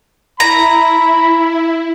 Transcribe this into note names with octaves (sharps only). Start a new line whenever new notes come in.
E4 A#5 B5